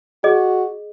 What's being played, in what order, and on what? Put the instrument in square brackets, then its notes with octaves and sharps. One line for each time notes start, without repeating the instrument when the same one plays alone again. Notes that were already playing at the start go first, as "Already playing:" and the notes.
[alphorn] F#4 [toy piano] G#4 D#5